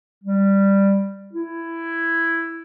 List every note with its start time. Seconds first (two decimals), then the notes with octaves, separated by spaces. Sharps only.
0.24 G3
1.33 E4